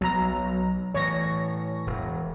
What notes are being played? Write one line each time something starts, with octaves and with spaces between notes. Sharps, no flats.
B1 F#3 A#5
A2 E3 C#5 C#6 A#6
E1